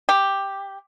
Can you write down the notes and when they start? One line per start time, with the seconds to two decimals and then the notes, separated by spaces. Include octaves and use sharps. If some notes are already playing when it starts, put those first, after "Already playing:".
0.09 G4